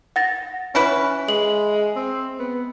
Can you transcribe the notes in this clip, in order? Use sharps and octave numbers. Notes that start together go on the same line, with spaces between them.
F#5 A6 A#6
E3 C#4 E4 B4
G#3 F#7
C4
B3